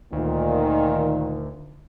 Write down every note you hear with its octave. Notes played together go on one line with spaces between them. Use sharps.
D2 A#2 D#3